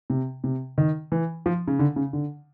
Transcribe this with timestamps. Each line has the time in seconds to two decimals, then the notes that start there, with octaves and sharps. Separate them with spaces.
0.10 C3
0.44 C3
0.78 D#3
1.12 E3
1.46 F3
1.68 C#3
1.79 D3
1.96 C#3
2.13 D3